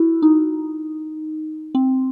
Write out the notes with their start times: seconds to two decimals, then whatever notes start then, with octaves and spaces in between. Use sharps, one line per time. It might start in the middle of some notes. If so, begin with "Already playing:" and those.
Already playing: E4 F#4
0.22 D#4
1.75 C4